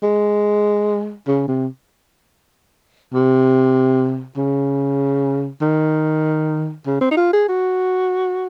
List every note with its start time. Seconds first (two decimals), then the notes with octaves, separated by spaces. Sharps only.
0.02 G#3
1.27 C#3
1.48 C3
3.13 C3
4.37 C#3
5.61 D#3
6.86 C#3
7.01 C4
7.11 D#4
7.17 F4
7.33 G#4
7.48 F#4